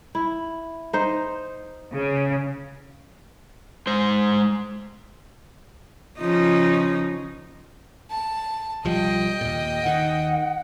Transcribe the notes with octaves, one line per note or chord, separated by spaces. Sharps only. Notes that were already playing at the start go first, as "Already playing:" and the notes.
E4
D#4 C5
C#3
G#3 C5
C#3 F3 D#4
A5
B1 F3 G3 D#5 G5
D#2 A#2
D#2 D#3 F#5